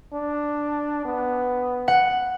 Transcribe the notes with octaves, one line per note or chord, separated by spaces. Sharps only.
D4
B3
F#5